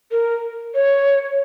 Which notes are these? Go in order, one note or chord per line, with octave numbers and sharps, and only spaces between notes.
A#4
C#5